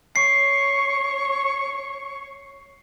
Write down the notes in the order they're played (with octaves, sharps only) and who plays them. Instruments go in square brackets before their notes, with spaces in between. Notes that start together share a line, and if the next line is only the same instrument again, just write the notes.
[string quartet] C#5 C#6 [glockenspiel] C7